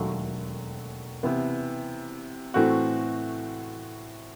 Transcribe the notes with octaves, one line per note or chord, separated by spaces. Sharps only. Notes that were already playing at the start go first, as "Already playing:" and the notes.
Already playing: E1 D#2 D#3 F#3 A3
C3 E3 B3 E4
A2 E3 A3 C4 F#4